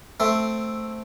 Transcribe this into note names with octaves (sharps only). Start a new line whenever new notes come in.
A3 C4